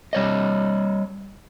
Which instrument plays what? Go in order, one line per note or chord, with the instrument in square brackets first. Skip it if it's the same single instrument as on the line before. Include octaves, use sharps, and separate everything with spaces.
[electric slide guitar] G3 C#5 D#5